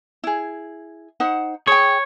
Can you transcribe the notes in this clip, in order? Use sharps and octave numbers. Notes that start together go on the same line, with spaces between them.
E4 G#4
D#4 C5 F#5
G#4 C#5 G5